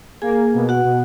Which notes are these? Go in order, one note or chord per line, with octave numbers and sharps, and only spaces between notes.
A#3 G#4 G#5
B2
F#4 F#5
B2